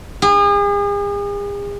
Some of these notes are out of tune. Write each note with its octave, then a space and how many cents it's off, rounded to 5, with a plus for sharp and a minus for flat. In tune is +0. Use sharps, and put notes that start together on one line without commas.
G#4 -40